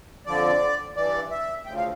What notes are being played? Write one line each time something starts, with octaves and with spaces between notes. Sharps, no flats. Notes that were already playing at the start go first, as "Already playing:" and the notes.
F2 D3 F3 D5
G2 E3 D5
E5
D2 C#3 F3 G5
F5